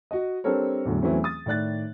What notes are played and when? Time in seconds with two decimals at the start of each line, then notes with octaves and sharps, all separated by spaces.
0.11 F#4 D#5
0.44 G3 C4 D4 A4 A#4 C#5
0.85 E2 A2 D3 F#3
1.02 E2 E3 F#3 A3 C4 C#4
1.24 D#6 A6
1.46 A2 D#3 D5 F#6 A6